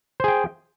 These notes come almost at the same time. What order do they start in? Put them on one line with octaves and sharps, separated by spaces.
C5 G#4 G5